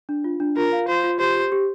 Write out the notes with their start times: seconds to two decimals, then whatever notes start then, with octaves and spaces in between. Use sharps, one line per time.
0.09 D4
0.24 F4
0.40 D4
0.57 F4 A#4
0.72 F5
0.88 F4 C5
1.04 F4
1.20 G4 C5
1.35 G4
1.52 G4